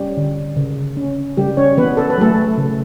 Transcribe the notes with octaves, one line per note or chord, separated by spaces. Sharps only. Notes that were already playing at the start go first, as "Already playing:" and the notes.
Already playing: G3 C#4 G4
D3
C#3
C#4
C#3 G3 G4
C#4 C#5
E3 B3 B4
A4
B4
F#3 A3 A4
C#3